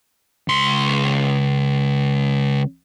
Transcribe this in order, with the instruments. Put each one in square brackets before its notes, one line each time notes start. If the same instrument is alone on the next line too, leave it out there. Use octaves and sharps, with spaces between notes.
[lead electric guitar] C#2 C6